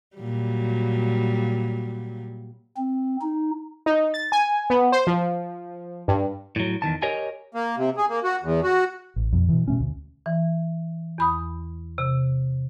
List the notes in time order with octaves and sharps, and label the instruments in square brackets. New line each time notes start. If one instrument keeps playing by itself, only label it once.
[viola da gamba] A#2 F#3 G3
[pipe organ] C4
D#4
[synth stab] D#4
A6
G#5
B3
C5
F3
G2
[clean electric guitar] A2 F#3
E2 D#3 A5
G4 A#4 C#5 D#5 G#5
[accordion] A#3
C3
G#4
A#3
F#4
E2
F#4
[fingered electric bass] A1
F2 B2
B2 E3
B2 A3 C#4
D2
[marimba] E3
E2 B5 D#6
C3